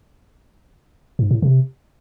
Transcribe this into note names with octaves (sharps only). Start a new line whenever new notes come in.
G#2
A2
C3